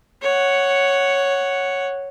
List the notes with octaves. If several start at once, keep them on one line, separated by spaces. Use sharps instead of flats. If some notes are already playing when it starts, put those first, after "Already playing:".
C#5 F#5